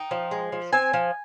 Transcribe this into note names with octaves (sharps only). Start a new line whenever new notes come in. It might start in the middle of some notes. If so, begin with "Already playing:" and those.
Already playing: D#4 G5
F3
G#3
F3
C4 G#5
F3